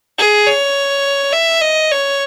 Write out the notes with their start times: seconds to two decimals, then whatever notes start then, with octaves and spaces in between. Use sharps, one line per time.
0.18 G#4
0.47 C#5
1.32 E5
1.61 D#5
1.91 C#5